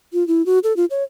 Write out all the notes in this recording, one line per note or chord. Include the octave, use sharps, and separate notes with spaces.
F4
E4
F#4
A4
F4
C#5